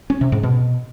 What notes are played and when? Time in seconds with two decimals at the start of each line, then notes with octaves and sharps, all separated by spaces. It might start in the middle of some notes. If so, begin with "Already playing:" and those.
0.10 C#4
0.21 C3
0.32 G#2
0.43 B2